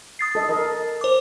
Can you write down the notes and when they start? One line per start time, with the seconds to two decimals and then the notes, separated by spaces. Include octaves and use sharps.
0.19 D#6 A6 C7
0.35 A4 D#5
0.49 A4 A#4 D#5
1.01 C5 D6